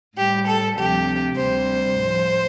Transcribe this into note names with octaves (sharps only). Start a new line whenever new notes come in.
A2 G3 G4
A4
D2 C3 F3 G4
D2 C3 G3 C5
A2 F3